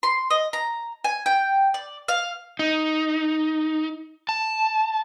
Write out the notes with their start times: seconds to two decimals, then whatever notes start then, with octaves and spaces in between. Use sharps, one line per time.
0.03 C6
0.30 D#5
0.53 A#5
1.04 G#5
1.26 G5
1.74 D5
2.08 F5
2.59 D#4
4.29 A5